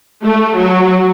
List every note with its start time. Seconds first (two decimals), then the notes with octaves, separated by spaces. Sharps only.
0.23 A3
0.55 F#3